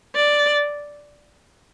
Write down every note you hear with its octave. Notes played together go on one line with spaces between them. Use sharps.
D5